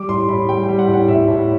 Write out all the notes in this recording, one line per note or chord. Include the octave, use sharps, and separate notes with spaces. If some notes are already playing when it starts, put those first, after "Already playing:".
Already playing: G3 D6
A2 C6
A2 B5
G3 G5
G5
G3
F#5
A2
F#5
A2 E5
A2